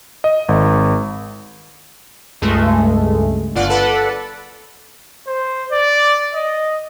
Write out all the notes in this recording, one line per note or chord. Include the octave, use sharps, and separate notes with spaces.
D#5
G#1
C#2 G2 G#3 A3
G1 F4 D5 F#5
A4 B4 D5 F#5
C5
D5
D#5